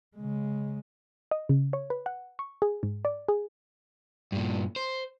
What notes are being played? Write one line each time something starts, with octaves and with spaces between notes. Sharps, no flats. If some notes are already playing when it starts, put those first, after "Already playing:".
C#3 G#3
D#5
C#3
C#5
B4
F#5
C#6
G#4
G#2
D5
G#4
G2 A#2
C5